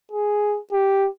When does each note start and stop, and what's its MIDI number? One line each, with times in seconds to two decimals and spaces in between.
0.12 0.59 68
0.72 1.09 67